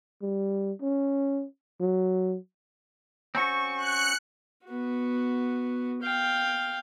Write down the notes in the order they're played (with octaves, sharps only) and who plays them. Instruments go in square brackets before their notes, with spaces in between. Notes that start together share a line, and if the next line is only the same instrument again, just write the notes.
[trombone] G3
C#4
F#3
[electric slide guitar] C4 C#4 F#4 [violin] C#6
[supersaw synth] F#6 C#7
[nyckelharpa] B3 F#4
F5 G5